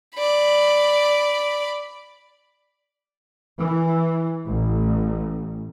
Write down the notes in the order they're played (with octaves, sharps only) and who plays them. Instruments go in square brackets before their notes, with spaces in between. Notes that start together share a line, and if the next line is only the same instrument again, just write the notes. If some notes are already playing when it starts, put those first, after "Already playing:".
[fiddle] D5 B5
[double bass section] E3
A1